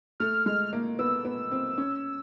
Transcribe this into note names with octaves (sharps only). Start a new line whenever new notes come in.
A3 F6
G#3 F6
A#3
B3 E6
B3
C4
C#4